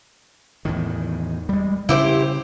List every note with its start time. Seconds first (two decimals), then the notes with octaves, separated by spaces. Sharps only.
0.65 E2 A2 D#3
1.49 G3 G#3
1.89 C#3 E4 G4 C5